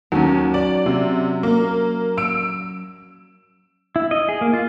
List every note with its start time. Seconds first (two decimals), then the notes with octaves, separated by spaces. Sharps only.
0.12 D#2 F#3 C#4
0.54 D5
0.86 C3
1.43 A#3
2.17 E6 D7
3.96 E4
4.11 D#5
4.29 G#4
4.41 A#3
4.53 F4